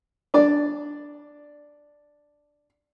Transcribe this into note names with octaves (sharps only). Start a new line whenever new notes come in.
D4 D5